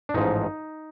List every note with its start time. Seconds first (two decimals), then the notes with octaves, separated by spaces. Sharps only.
0.09 D4
0.14 A1 G#2 F3 D#4